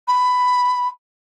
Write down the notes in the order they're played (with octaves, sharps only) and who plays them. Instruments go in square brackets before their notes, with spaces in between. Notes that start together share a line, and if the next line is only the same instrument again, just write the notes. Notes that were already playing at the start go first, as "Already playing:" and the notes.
[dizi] B5